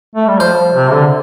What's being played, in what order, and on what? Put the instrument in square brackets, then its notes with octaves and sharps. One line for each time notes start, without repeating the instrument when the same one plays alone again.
[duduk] A3
G3
[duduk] F3 [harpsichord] C5
[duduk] C3
D3